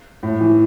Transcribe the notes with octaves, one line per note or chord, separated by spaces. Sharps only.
A2
E3